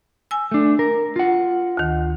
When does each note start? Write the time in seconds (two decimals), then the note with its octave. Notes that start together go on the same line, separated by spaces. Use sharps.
0.31 G#5 E6
0.52 A3 D4
0.79 A#4
1.16 F4 F#5
1.77 D2 D#3